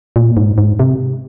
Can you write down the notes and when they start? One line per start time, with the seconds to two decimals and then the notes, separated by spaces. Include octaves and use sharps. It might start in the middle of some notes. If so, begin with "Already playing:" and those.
0.16 A#2
0.37 G#2
0.58 G#2
0.79 C3